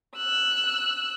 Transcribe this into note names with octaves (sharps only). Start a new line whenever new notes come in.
E6 F#6